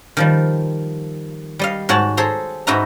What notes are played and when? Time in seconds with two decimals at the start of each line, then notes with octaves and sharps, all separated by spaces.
0.17 D#3 F3 G3
1.59 G3 D#5 F5
1.89 G#2 F#4 C#5 F#5 A5
2.17 G#4 A4 C5 A#5
2.67 G#2 D#4 F#4 B4 E5 A#5